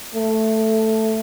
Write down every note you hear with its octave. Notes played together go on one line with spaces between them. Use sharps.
A3